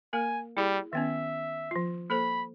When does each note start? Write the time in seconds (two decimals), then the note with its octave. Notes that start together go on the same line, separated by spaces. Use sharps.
0.13 A#3 A#4 G#5
0.57 G3 E4 G#4
0.93 D#3 B3 C#4 E5
1.71 F3 F4
2.10 A#3 A4 C5 B5